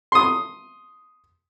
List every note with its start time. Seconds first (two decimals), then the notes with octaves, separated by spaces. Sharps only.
0.12 C6 D#6